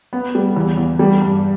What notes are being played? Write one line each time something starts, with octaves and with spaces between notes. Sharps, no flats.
B3
G3
E2
E2
G3
G2